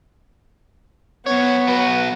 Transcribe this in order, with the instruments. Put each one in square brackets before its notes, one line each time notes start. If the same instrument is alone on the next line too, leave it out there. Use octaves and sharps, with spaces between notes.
[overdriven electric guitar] F#2 C#5 [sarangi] B3
[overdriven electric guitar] F#3 B4